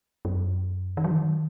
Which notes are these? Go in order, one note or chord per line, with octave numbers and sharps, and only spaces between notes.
F#2
D#3
F#3
D#3